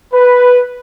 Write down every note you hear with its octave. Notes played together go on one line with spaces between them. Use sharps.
B4